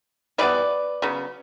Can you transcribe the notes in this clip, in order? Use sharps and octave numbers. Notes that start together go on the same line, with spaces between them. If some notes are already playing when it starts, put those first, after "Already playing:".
E3 G3 B3 B4 D5
C#3 F#3 B3